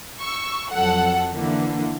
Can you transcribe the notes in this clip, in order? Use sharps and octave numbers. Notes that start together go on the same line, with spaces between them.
C#6 E6
F2 F#3 A4 F#5
D3 E3 A#3